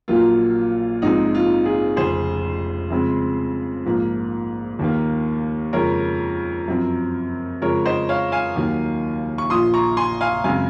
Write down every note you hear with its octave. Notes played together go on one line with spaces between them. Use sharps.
A#1 A#2 F#3 A#3 F4
A#1 G#2 F3 G#3 C4 D#4
F4
F4 G#4
F1 F2 C#3 G#4 C5
F2 C#3 G#3 C4
A#1 G#2 F3 A#3
D#2 D#3 A#3
F2 C#3 G#3 A#4 C#5
F#2 F3 C4
F2 C#3 F3 G#3 A#4 C#5
C5 D#5
C#5 F5
F5 G#5
D#2 D#3 F#3 A#3
C#6
A#1 A#2 F3 C6 D#6
A#5 C#6
G#5 C6
F5 G#5
F#2 C#3 G#3 C4 F5 G#5